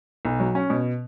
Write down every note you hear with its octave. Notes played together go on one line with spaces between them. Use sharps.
B1
F#3
C#4
B2